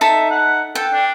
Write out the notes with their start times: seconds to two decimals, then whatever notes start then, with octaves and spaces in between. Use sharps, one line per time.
0.01 D#4 A4 E5 A5
0.30 F#5
0.75 A4 G5
0.93 D4